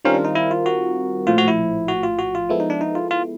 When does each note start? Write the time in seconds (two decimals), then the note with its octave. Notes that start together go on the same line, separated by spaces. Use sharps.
0.05 D#3 G3 C4 C#4 F4 A#4
0.14 D4
0.25 D#4
0.35 E4
0.51 F4
0.66 F#4
1.27 A#1 A2 F3 F4
1.38 F#4
1.48 E4
1.88 F#4
2.03 F4
2.19 F#4
2.35 F4
2.49 F3 G#3 B3 E4 A4
2.60 D#4
2.70 D4
2.81 D#4
2.95 F4
3.11 F4